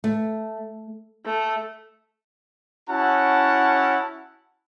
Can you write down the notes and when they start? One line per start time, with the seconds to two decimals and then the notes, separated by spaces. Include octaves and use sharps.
0.04 A3
1.26 A3
2.89 C#4 E4 F#4 F#5 A5